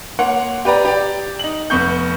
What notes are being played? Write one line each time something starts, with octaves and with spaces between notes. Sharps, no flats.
A#3 C#5 F#5 C6
G4 B4 D5 A#5
G4 D5
D#4 F#7
F1 B3 C#6 G6